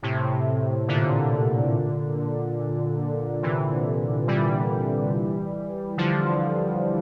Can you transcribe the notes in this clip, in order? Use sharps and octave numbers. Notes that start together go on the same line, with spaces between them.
A2 C3
A#2 D3
C3 E3
E3 G3
D3 F3